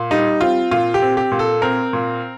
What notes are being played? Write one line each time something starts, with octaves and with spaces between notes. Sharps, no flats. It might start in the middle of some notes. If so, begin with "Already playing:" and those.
Already playing: A#2
G3 D#4
C4 F4
A#2 F4
G4
C4
G4
A#2
A4
C4 A#4
A#2